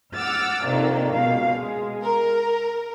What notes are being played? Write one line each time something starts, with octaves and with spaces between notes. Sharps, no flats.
F#5 D6 E6 F6 A6
F2 C3 D#3 A#3 D4
C#2 B2 F5
G#3
A#4